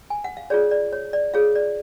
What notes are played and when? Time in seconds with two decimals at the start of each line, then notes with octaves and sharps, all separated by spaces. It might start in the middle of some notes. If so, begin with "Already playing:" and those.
0.10 G#5
0.24 F#5
0.37 F5
0.50 F4 G#4 C#5 D5
0.71 D5
0.93 C#5
1.13 D5
1.34 F4 G#4 C#5 F5
1.56 D5